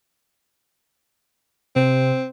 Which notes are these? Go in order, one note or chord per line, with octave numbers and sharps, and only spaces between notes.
C3 C4